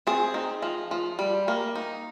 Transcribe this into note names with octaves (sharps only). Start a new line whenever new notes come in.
C4 G#4
D#4
F3
F3
G3
A#3
D#4